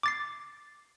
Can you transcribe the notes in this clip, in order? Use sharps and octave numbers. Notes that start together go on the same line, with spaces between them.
D6 A6 C7